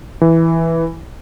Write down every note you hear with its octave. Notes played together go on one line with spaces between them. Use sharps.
E3